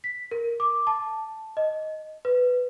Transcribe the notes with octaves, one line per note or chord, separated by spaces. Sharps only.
B6
A#4
D6
A5
D#5
B4